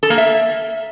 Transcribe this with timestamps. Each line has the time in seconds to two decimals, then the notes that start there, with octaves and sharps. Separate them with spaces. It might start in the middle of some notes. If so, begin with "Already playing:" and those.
0.03 A4
0.10 A#3
0.18 E5